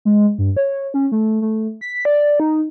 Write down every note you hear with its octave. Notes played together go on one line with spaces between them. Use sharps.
G#3
G2
C#5
C#4
A3
A3
B6
D5
D#4